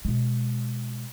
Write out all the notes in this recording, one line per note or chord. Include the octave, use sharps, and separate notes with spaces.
B2 G#3